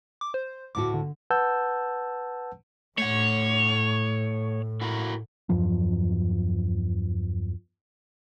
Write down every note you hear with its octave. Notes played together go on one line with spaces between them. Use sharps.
D6
C5
D2 A2 F#4 D6
D3
B4 F#5 A5 E6 G6
A2 A3 C#5 F#5
E4 F#4 A#4
E2 G2 F3 F#3